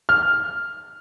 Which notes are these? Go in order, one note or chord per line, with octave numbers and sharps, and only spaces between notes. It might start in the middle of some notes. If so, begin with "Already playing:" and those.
F6